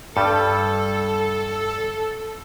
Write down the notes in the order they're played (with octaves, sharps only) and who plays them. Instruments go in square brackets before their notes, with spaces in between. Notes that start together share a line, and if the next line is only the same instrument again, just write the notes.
[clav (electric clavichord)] G2 G3 [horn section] A4